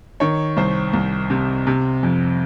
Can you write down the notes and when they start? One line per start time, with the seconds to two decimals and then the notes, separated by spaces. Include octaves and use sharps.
0.20 D#3 C#5
0.57 C2 C5
0.93 C2
1.30 C3
1.67 C3
2.03 F2